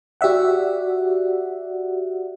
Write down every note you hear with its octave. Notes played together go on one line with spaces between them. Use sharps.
F#4 G4 D5 E5 F#5